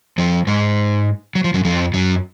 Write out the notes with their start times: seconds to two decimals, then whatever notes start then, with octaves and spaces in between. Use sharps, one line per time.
0.18 F2 F3
0.47 G#2 G#3
1.35 F#3
1.44 F3
1.54 F#2 F#3
1.65 F2 F3
1.94 F#2 F#3